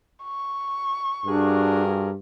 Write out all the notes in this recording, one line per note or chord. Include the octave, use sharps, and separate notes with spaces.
C#6
G2 D4 F#4 G#4 A#4